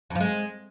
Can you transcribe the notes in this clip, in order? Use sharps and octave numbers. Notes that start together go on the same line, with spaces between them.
F2
F3
G#3